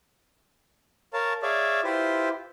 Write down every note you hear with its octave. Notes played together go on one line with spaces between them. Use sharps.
A#4 C#5 F5 A5
G#4 C#5 D5 E5 F5
E4 F4 G4 B4 C5